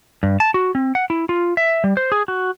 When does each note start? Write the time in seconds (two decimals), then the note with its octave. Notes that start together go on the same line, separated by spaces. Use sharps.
0.23 G2
0.40 A5
0.54 F#4
0.75 C4
0.95 F#5
1.10 E4
1.29 F4
1.57 E5
1.84 G3
1.97 C5
2.12 G#4
2.28 F#4